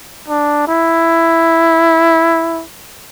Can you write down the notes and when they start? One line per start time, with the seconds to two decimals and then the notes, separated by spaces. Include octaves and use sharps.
0.28 D4
0.68 E4